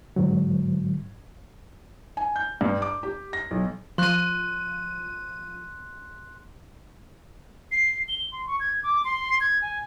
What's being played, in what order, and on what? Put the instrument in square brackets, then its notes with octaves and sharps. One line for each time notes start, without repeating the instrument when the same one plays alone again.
[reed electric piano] G#2 D3 F#3
[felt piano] G#5
G6
G2
D6
G4
A#6
B1
[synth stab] F3 D#7 [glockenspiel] C6 F#6
[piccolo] C7
G7
C6
C#6
G#6
D6
C6
G#6
G#5